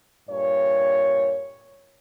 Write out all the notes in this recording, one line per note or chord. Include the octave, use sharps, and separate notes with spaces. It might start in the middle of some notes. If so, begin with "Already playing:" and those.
G2 A#2 C#5